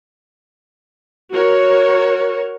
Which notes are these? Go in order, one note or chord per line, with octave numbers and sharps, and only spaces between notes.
F#4 A#4 C#5